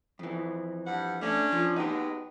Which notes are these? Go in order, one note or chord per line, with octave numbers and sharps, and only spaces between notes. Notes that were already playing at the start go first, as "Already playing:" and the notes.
F2 E3
G2 F#5
A3 C#4 D4
F3
F#3 G#3 B3 D#4 G4